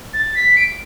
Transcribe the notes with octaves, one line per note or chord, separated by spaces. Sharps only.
A6
B6
D7